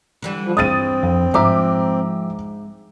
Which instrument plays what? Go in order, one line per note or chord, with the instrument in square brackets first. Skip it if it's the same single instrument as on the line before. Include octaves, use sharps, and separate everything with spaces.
[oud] D3 E3 G3
[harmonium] F3
[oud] G2 E3 [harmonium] C4 [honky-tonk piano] D#6 A6 D#7
[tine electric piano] F2
[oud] G#2 [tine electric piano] F3 E5 [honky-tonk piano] A#5 D6